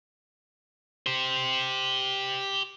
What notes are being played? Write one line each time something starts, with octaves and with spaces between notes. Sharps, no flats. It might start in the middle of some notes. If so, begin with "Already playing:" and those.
G4 C5